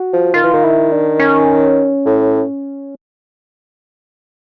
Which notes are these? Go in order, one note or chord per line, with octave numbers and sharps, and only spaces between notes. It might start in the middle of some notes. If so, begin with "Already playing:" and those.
Already playing: F#4
F3
D#3 F4
E3
D#3
E4
D4
C#4
A2